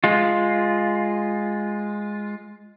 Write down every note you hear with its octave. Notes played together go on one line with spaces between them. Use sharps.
G#3 F4